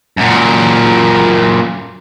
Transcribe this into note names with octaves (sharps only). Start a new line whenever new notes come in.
F#2 A#2